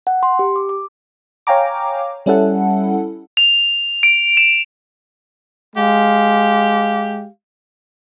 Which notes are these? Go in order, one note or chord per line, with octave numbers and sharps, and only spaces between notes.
F#5
C6
G4
D6
D6
C#5 F5 G5 G#5 A#5 D6
G3 C#4 E4 A4 F#5
F7
D7
E7
G#3 G4 F5